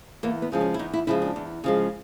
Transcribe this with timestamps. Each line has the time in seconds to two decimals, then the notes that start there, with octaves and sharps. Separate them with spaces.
0.23 E2 A#3
0.42 B3
0.52 C#3 F3 G#3
0.61 C#4
0.74 E4
0.79 E2 D#4
0.93 E4
1.07 C#3 F3 G#3 E4
1.22 D4
1.36 E2
1.64 C#3 F3 G#3